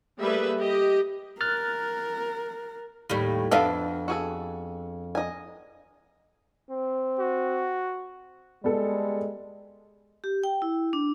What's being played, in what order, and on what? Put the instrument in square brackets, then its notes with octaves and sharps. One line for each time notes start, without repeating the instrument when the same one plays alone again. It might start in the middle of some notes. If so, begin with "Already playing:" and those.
[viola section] G3 A3 A#3 G#4 B4 E5
G4 D#5
[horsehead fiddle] A#4 [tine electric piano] F6 F#6 A6
[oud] D#2 A2 G3
[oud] F2 B3 D4 [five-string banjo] A4 E5 F5
[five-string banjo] F#4 G#4 A4
D#5 G#5
[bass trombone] C4
[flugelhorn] F#4
[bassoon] G3 [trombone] G#3 [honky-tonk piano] B3 A4
[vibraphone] G4
G5
E4
D4